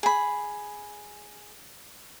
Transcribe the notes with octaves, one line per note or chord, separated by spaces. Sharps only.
G#4 B5